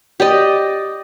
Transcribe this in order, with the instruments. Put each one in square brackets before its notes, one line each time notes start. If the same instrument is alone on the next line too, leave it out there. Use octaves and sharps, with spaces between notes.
[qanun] G4 D5 D#5